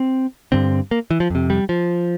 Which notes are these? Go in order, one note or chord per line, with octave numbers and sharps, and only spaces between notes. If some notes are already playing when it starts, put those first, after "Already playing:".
Already playing: C4
G2 D3 C4
A#3
E3
F3
F2 C3
G3
F3